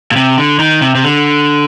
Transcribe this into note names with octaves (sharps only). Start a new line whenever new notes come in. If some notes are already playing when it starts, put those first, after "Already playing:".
A#2
C3
D3
D#3
C3
C3
D3